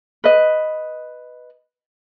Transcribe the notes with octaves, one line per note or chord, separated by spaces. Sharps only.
B4 D#5